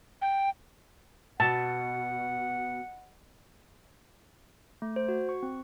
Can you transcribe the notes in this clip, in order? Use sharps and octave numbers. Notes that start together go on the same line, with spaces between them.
G5
B2 F#5 A5
A3
C5
F#4
C#6
C4